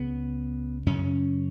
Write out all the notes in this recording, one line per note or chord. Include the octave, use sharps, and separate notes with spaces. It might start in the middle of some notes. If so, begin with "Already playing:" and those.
Already playing: C#2 C#3 B3
F#2 C#3 C#4